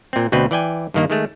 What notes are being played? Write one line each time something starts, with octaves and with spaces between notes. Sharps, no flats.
A#2 C4
D2 B2 C4 B4
E3 D5 G5 G#5
G2 D#3 A#3
D#3 G#3 A3